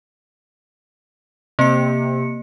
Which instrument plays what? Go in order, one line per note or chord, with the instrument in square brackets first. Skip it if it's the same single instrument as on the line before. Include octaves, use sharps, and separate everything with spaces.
[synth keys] C3 [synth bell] A#3 C#7